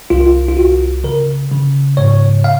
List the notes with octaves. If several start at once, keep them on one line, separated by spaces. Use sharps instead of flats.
C2 F4
F4
C2 F#4
C#3 A#4
C#3
G#2 C#5
F5